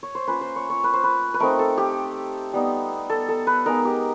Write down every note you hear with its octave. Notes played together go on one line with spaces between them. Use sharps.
C#5
C5
A#3 C#4 F4 B4
C5
C#5
C#5
B4
C5
B4
B4
A3 C4 D#4 A#4
A4
G4
G3 B3 D#4
A4
A4
B4
G#3 B3 D#4 A#4
G4